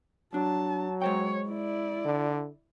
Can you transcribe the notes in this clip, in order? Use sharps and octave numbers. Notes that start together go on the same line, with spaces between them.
F#3 D4 A5
G#3 C5 C#5 G5
E4 D5
D3